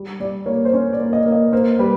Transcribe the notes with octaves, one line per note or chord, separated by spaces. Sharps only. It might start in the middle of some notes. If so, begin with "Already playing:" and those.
Already playing: G3
G3 D5
A#3 C#5
C5
C#4 C#5
D5
A#3
D#5
A#3
D#5
A#3 C5
G3 B4